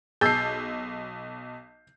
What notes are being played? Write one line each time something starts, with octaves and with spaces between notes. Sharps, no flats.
B1 G#4 A5 E6 G6 C7